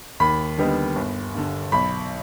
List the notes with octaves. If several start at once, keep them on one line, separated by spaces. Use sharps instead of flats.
D#2 B5
D3 G3 B3 D#4
G1
G2 D3
B1 B5